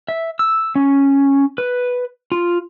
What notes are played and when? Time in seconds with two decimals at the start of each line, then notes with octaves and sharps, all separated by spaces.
0.08 E5
0.39 E6
0.76 C#4
1.58 B4
2.32 F4